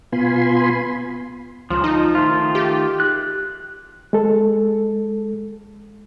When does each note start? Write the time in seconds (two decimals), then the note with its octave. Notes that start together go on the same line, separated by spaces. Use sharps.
0.12 B2 B3 F4 G#5 B5 C6
1.70 C#2 F3
1.84 F3 D#4
2.15 D#3 A3 F4
2.55 G4
3.00 F#6
4.13 G#3 A4